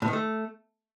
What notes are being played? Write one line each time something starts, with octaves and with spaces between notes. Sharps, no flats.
A2
D#3
A3